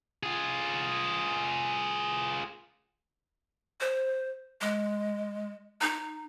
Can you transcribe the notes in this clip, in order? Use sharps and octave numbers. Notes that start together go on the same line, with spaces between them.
F4 G#4
C5
G#3
D#4